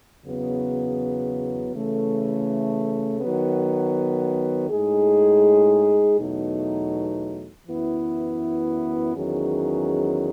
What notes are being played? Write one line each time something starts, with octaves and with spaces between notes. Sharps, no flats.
E2 C#3 F#3 B3
C#3 E3 A3
D#3 F#3 B3
A2 G#3 D#4 G#4
E2 B2 F#3 A3 D#4
F#2 E3 B3 E4
E2 D#3 F#3 C#4 G#4